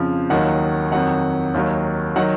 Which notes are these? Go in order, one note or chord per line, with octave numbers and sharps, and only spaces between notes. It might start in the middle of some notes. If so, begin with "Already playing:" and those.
Already playing: F2 C#3 F3
D#2 D#3 F#3 F#5
F2 D#3 F#3 F#5
D#2 D#3 F#3
D#3 F#3 F#5